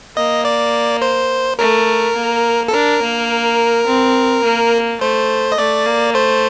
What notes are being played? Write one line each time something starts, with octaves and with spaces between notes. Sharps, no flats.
A#3 D#5
D5
C5
A3 A#4
A#3
A4
D4 A#4
A#3
C4
A#3
A3 C5
D#5
A3 D5
A#3
A3 C5